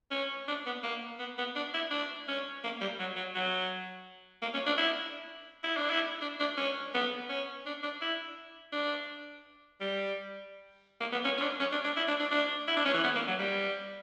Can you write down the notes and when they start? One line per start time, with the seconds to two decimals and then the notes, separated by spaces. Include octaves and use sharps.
0.11 C#4
0.48 D4
0.66 B3
0.83 A#3
1.19 B3
1.38 B3
1.56 D4
1.74 E4
1.91 D4
2.28 C#4
2.64 A#3
2.81 G3
3.00 F#3
3.16 F#3
3.35 F#3
4.42 A#3
4.54 C#4
4.66 D4
4.78 E4
5.64 E4
5.77 D4
5.90 E4
6.22 D4
6.40 D4
6.57 C#4
6.94 B3
7.29 C#4
7.66 D4
7.83 D4
8.02 E4
8.73 D4
9.81 G3
11.01 A#3
11.12 B3
11.24 C#4
11.37 C#4
11.42 D4
11.60 C#4
11.72 D4
11.84 D4
11.97 E4
12.08 D4
12.20 D4
12.31 D4
12.68 E4
12.77 D4
12.85 C#4
12.94 E3
13.04 B3
13.15 A#3
13.28 F#3
13.39 G3